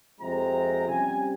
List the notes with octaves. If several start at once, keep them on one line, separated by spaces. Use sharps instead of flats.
F2 C3 F3 G#3 C4 A#5
C3 G3 C#4 G#5